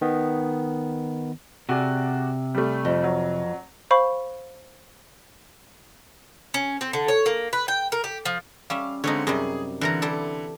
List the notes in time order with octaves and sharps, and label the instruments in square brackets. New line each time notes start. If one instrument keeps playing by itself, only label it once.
[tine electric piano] D#3 B3
[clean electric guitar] C3 [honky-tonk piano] F#4 G#4 D5
[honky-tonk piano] G3 A3
[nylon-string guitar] F2
[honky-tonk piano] F#3
[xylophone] C5 F5 B5 C#6
[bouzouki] C#4
C4
D3
C#5
A#3
B4
G5
A#4
G4
F3
[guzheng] G3 C#4 E5 [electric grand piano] F5
[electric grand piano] D3 G#3 C4 [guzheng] D#4 F4 C#5
[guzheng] F#2 C3 G3 [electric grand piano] G#4
[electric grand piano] D3 [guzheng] E3 A#4 A#5
[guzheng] G3 E4 A4